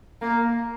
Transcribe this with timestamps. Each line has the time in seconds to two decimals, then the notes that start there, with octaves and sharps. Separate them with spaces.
0.22 A#3